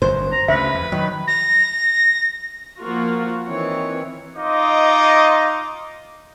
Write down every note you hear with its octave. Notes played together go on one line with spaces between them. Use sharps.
G1 F#2 C5
A#5
D2 C#3 B4 E5
F2
D#3 F#3
A#6
F3 A#3 F4 F#4
D#3 E3 C4 C#5
D#4 F4 D#5 C6 D6